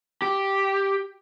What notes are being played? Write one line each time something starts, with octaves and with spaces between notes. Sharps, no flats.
G4